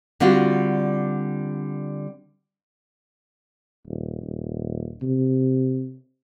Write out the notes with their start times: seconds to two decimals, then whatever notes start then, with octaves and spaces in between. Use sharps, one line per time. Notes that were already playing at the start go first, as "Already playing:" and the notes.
0.20 D3 G3 C4 F4 F#4
3.87 D#1
4.22 D#1
5.02 C3